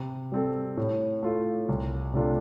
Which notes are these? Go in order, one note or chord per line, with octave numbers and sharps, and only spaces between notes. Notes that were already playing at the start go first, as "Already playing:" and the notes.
Already playing: C3
G3 C4 A4
A2
A3 F4
C2
C3 A3 D4 F4